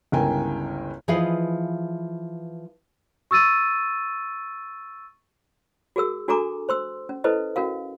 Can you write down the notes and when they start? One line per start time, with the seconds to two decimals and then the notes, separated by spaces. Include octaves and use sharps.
0.12 G1 C#2 E4 A#4 G5 G#5
1.08 E3 F3 G#4 B4 D#5 F5
3.31 C#6 E6 A6 D#7
5.96 F#4 G#4 A#4 E6
6.28 D4 F#4 A4 G#5 A#5 D6
6.69 C5 C6 E6
7.09 C#4
7.24 E4 A4 B4 C5 D#5
7.56 C#4 F#4 A#4 F5